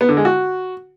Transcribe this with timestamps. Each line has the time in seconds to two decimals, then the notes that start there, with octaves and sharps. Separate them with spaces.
0.01 B3
0.09 D3
0.17 G#3
0.25 F#4